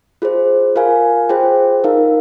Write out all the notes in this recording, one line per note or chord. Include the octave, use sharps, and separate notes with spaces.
F4 G#4 C5
F4 A#4 F5 G#5
F4 G#4 C5 G5
D#4 A#4 F5